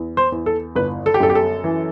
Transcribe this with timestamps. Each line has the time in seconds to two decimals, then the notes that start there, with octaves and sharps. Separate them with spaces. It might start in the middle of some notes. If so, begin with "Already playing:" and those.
Already playing: E2
0.17 C5
0.32 E2
0.46 A4
0.76 G1 B4
1.06 A4
1.14 G4
1.20 F#2 A4
1.30 G4
1.35 A4
1.64 E3